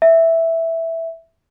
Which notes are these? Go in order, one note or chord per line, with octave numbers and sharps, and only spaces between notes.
E5